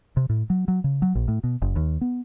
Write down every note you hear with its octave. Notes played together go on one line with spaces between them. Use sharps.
C3
A2
F#3
F#3
C#3
F#3
A#1
A2
B2
F#1
D#2
B3